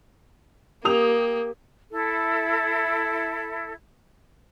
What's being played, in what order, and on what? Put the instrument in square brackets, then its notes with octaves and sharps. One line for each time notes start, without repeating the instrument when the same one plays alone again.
[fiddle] A#3 [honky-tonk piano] G4 D#6 F7
[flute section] E4 A4